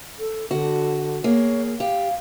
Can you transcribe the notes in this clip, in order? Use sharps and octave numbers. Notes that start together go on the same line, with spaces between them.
A4
D3 F#4
A#3 G#4 C#5
G4 F5